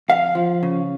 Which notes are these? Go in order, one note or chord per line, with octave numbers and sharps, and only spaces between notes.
F2 F5
F3
C#3